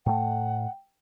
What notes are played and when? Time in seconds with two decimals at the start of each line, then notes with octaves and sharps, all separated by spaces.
0.06 A2 A3 F#5 G5